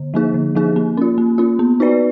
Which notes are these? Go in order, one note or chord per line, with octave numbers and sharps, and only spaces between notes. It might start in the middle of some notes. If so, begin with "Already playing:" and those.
Already playing: D3
F3 A#3 D#4 G#4
D3
F3 A#3 D#4 G#4
A#3
C#4 F4
A#3
C#4 F4
B3
D#4 F#4 B4 D5